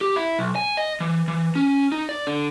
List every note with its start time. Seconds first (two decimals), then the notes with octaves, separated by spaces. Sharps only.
0.01 G4
0.16 E4
0.39 B1
0.55 G#5
0.77 D#5
1.00 E3
1.28 E3
1.55 C#4
1.92 D#4
2.09 D5
2.27 D3